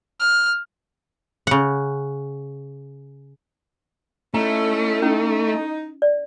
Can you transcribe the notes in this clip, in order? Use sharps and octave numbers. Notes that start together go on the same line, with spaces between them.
F6
C#3 F#5
A3 C#4 D#4 E4 A#5
C#4 D#4 E4
D5